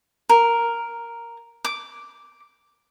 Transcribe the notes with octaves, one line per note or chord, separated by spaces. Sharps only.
A#4
D6